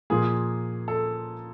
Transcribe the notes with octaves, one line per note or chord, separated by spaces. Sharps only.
A#2 F3 A#3 G#4
A4